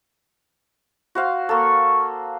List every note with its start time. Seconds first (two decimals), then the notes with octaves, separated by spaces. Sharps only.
1.15 F#4 C5 F5
1.49 A#3 A4 C#6